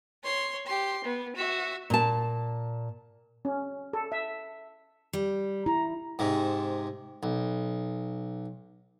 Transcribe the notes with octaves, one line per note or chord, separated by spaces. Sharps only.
C#5 C6
G4 C6
B3
F#4 E5
A#2 A5
C#4
A4
E5
G3
E4 A#5
G#2 C3
B1